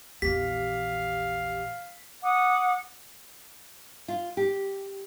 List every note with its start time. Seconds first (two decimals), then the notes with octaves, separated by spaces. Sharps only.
0.22 A#1 E2 G4 F5 B6
2.22 F#5 D6 D#6
4.08 F4
4.37 G4